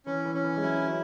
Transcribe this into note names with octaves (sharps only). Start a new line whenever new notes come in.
E3 C#4
E3
C#4
E3
G#3
F#3 E4